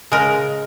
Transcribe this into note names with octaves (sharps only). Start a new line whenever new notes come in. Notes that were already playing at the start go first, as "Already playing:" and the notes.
C#3 G#3 A#4